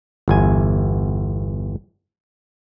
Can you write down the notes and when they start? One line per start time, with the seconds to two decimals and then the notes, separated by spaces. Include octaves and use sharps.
0.28 G1 E2 G#5